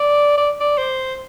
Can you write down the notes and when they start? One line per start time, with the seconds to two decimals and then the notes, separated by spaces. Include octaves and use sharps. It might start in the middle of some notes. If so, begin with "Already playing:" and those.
Already playing: D5
0.37 D5
0.60 D5
0.78 C5